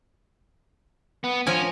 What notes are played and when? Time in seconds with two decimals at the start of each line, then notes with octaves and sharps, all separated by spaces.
1.24 B3
1.47 F3 C#4 A#4 G#5